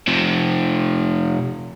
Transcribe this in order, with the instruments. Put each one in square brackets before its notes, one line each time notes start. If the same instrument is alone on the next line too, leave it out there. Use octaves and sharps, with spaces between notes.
[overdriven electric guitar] C3 F3